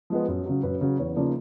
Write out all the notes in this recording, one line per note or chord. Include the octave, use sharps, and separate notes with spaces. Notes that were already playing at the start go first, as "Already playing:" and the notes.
F3 G#3 B3
F#2
C#3 F#3
F#2 B4
C#3 F#3
E2 C#5
C#3 F3 A#3 D#4 D5